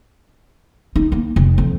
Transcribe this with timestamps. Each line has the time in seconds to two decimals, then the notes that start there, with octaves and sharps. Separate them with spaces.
0.96 D#4
1.12 A#3
1.36 F1
1.58 F2